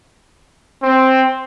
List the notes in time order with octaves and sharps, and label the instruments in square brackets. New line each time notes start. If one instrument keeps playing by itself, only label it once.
[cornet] C4